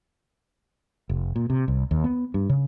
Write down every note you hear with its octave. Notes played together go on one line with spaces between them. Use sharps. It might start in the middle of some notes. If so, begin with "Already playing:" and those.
F1
A#2
C3
C2
D#2
B3
G2
C#3